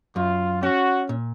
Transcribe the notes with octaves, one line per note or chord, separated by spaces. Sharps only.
F#2 F4
C#4 F#4
A#2